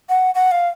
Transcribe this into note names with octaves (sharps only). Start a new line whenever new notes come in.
F#5
F#5
F5